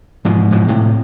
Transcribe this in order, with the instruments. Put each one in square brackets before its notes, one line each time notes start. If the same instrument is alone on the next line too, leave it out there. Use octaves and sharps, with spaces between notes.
[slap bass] G#2 B2 E3 F3
G#2 B2 E3 F3
A2 C3